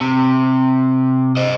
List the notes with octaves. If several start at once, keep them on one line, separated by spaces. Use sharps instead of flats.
C3
C5 D#5